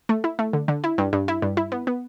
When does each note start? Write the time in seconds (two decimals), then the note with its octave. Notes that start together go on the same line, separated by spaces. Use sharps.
0.09 A3
0.24 E4
0.39 A3
0.53 D3
0.68 D3
0.84 E4
0.98 G2
1.13 G2
1.28 E4
1.42 G2
1.57 E4
1.72 B3
1.87 B3